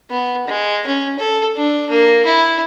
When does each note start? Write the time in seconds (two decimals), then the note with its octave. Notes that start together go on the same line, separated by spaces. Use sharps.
0.10 B3
0.47 G#3
0.87 C#4
1.19 A4
1.57 D4
1.90 A#3
2.25 E4